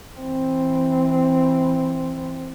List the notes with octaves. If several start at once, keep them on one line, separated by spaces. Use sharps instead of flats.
E3 C4